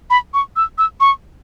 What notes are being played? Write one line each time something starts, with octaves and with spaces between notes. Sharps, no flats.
B5
C#6
E6
E6
C#6